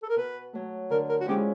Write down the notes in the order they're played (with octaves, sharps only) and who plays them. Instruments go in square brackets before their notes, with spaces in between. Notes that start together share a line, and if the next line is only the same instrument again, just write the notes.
[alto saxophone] A4
A#4
[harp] B2 [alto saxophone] B4
[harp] F#3 A3
[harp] D3 [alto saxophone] A#4
[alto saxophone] A#4
F#4
[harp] F3 G#3 C#4 E4 [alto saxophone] G4